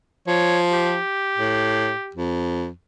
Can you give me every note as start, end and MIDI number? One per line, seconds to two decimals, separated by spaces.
0.28 0.98 53
0.28 0.58 73
0.72 2.16 67
1.38 1.92 45
2.15 2.69 41